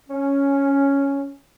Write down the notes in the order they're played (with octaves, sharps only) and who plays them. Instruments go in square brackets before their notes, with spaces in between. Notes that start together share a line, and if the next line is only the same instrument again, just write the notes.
[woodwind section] C#4